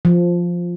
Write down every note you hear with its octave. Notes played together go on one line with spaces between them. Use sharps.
F3